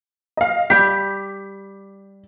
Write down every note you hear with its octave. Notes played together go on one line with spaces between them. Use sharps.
D#5 F5
G3 G4 B6